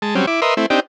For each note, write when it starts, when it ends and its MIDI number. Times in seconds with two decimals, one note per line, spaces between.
0.02 0.15 56
0.02 0.15 81
0.15 0.26 54
0.15 0.26 55
0.15 0.26 60
0.15 0.26 61
0.27 0.40 64
0.27 0.40 86
0.42 0.54 70
0.42 0.54 71
0.42 0.54 75
0.42 0.54 76
0.42 0.54 84
0.57 0.66 57
0.57 0.66 60
0.57 0.66 64
0.70 0.80 60
0.70 0.80 62
0.70 0.80 63
0.70 0.80 67